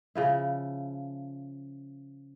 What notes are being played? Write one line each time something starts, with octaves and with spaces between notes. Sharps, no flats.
C#3 F3 E4